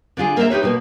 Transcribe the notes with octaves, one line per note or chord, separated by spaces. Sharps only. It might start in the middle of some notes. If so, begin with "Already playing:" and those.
D3 D4 F4 G#4
A#3 C4 A#4 C5 E5
D#4 G4 B4 C#5
B2 A#3 F#4